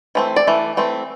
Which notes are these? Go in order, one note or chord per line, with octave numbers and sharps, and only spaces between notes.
E3 A3 C4
D5
E3 A3
E3 A3 C4